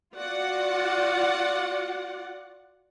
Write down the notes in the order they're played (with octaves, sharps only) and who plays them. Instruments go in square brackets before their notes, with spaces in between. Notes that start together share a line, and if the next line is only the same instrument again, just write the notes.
[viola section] F4 F#4 D5 F#5